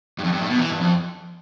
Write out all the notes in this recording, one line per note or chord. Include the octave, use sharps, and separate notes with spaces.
G2
F2
G2
A2
B2
E3
G2
F2